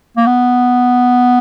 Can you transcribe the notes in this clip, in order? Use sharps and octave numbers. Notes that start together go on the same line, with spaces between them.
A#3
B3